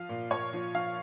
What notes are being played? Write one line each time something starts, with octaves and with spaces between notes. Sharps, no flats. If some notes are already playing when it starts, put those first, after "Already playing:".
Already playing: F3 F5
A#2
A#2 C#5
F3
F3 F5